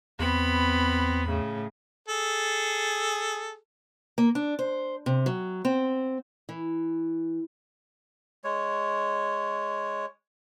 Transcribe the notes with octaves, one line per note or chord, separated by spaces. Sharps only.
E2 B3 C4 B5
A2 C#3
G#4 A4
A#3
D4
C5
C3
F#3
C4
E3
G#3 C#5